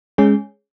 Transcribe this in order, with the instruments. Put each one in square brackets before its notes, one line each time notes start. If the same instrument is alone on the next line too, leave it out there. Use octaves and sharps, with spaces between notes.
[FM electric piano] G#3 C#4 G#4